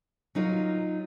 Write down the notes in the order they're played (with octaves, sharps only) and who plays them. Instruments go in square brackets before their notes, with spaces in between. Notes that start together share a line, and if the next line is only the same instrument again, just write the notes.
[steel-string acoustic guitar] F#3 D#4 F4 A#4